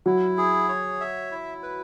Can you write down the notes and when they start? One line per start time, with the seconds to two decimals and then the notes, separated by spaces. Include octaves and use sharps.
0.06 F#3 E4 F#4
0.38 G#4
0.69 C#5
1.00 E5
1.31 E4
1.63 B4